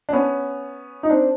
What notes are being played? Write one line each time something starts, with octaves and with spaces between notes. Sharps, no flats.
D4
B3 C#4
D#4
C4 D4